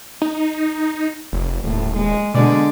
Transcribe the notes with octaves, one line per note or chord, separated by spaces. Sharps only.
D#4
F1
D#1 A2
G#3
B2 D3 G#3 D5